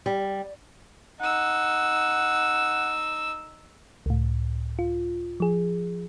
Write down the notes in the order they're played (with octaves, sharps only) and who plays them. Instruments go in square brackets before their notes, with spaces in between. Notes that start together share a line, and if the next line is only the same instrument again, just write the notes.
[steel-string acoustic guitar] G3
[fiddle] D#4 E6 [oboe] F#5
[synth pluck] C#2 A2
F4
F3 G#4